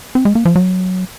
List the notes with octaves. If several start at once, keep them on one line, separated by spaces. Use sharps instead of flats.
C4
G#3
A#3
F3
F#3